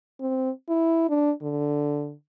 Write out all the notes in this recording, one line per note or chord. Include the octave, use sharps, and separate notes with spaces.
C4
E4
D4
D3